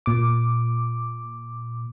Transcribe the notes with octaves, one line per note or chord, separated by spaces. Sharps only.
A#2 D6